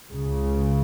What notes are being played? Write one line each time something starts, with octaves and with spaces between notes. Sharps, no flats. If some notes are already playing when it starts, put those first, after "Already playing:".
C#2 C#3